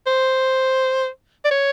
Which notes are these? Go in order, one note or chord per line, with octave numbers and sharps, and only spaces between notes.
C5
D5
C#5